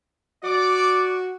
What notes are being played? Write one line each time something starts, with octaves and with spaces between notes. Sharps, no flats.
F#4 D5 D6